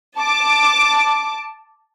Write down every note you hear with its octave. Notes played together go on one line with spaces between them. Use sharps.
A5 D6